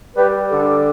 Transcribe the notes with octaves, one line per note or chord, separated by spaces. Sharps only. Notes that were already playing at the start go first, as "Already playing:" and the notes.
G3 G4 B4
D3 A4